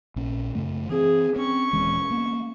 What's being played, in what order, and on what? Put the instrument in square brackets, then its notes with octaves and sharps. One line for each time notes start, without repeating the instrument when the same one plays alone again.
[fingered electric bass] A#1 C#4
F#2 C#3 A3
[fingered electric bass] E3 C4 [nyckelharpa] G#4
[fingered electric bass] C4 [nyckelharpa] C#4 C#6
[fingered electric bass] D#1 E3 G#3
A#3 B3